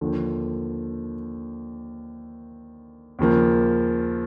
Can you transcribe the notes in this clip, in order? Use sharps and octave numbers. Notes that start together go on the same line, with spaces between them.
D#2 D3 F3
D#2 C#3 F3 A#3